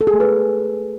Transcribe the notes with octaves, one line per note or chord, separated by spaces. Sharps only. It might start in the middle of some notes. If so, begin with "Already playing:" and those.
A4
G#4
A3
B4